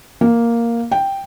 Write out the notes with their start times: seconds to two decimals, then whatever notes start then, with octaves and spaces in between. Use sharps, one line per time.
0.21 A#3
0.92 G5